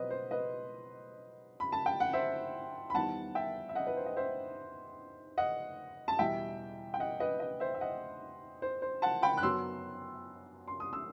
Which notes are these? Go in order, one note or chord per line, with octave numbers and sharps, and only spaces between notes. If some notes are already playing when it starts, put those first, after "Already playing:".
Already playing: B2 F#3 C4 B4 D#5
C5
B4 D#5
B5
A5
G5
F#5
C5 E5
B5
E2 D#3 G3 B3 F#5 A5
E5 G5
E5
D#5 F#5
B4
C5
D#5
C5 E5
D#5 F#5
A5
E2 B2 G3 E5 G5
G5
D#5 F#5
B4 D#5
B4 D#5
C5 E5
E5
D#5 F#5
C5
C5
F#5 A5
G5 B5
F#6
F#2 F#3 B3 C6 E6
C6
D#6
E6